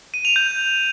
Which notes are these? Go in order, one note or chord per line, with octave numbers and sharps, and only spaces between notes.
D#7
F7
G6